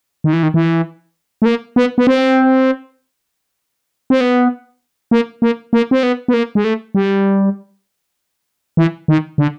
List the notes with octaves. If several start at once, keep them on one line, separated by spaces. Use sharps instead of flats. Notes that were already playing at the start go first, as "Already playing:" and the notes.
D#3
E3
D#3
E3
A3
A#3
B3
B3
C4
C4
B3
A#3
A#3
A#3
C4
B3
B3
A#3
G#3
A3
G3
E3
D#3
D3